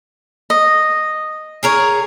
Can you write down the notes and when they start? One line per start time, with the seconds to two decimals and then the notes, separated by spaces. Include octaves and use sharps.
0.50 D#5
1.63 G#4 A#4 C#5